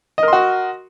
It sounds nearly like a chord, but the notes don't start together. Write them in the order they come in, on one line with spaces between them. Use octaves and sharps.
D#5 A#4 C6 F#4